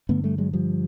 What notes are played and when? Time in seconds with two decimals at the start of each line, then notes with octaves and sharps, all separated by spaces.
0.09 G2 D3 A3 B3
0.24 G3 A3
0.38 F#3 G#3
0.53 F3 G3